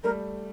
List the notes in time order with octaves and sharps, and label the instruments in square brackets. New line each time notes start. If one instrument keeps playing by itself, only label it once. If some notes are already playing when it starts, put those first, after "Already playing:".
[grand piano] G3 A3 [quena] A#4